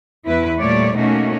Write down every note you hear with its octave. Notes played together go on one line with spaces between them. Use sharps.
E2 E4 B4
A#2 G3 A3 C#5 D5
B2 A3 A#3 C#4 D#4 F#4